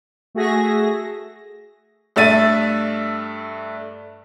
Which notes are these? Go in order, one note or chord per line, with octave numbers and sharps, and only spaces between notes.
A3 F#4 G#4 E5 A#6
G2 A3 D4 E5 A6 D#7